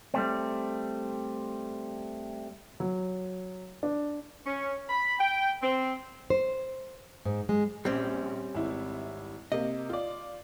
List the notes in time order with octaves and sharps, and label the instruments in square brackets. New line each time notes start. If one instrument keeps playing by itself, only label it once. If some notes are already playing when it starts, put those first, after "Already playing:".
[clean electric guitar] G3 A3 C4
[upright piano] F#3
D4
[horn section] C#4
B5
G5
C4
[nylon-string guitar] C5
G#2
G#3
[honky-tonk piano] A#1 [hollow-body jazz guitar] G3 C4 C#4
[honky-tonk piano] G#1 E4
[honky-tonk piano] C3 A#3 [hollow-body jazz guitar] D#5
[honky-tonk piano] F4 D5